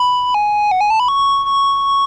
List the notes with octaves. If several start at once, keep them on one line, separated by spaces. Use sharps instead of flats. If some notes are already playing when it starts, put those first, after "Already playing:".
Already playing: B5
G#5
F#5
G#5
A5
B5
C#6
C#6